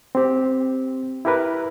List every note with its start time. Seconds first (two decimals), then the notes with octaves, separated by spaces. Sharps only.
0.15 C4 G4
1.25 E4 G4 A#4 B4